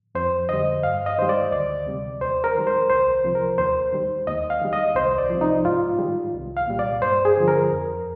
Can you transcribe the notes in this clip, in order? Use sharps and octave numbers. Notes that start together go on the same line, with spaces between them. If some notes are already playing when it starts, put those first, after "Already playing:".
F2 C5
D3 G3 D#5
G2 F5
D#5
D#3 G3 C5
D5
D2 D5
C3 G3
D#2 C5
A#4
D#3 G3
C5
C2 C5
C3 F3
A#4
D#2 C5
D#3 G3
D#2 D#5
F5
D#3 G3
D#5
C2 C5
D5
C3 F3
D#4
G#2 F4
D#3 G3
C2
F5
A#2 G3
D5
G2 C5
G#4
D3 F3
A#4
F2